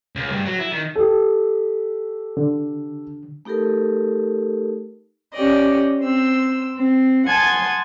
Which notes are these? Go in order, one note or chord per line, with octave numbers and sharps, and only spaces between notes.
C#2
G2
F#3
E4
D#3
G4 A4
D3
A3 D#4 G4 A4 A#4
C#4 G4 D5 D#5
C4 E6
C4
F#5 G#5 A5 C6 D#6 G#6